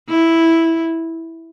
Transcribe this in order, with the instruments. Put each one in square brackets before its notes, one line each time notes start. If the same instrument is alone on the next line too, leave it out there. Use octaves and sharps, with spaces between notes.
[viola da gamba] E4